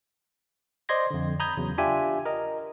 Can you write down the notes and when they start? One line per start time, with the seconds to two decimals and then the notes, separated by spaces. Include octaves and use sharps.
0.89 C5 D5 D#5 C6 G#6 A#6
1.10 F2 D3
1.40 A#5 B5 D#6 G6 G#6
1.57 E2 C#3 F#3
1.78 D4 F4 G4 E5 G#5
2.25 A#4 D#5